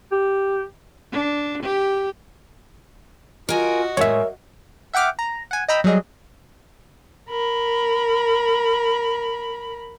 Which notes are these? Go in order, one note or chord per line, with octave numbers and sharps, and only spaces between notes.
G4
D4
G4
F4 F#4 A#4 D#5 G#5
A2 G#3 A#4 C#5 E5
E5 F#5 G5 D6 F6
A#5
F#5 G#5
D#5 G5 A#5 B5 E6
F#3 G3 G#4 D#5
A#4 B5